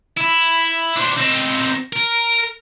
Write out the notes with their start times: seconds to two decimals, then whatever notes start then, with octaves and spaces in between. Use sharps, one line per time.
0.17 E4
0.97 D4 C5
1.18 C4 D#4
1.93 A#4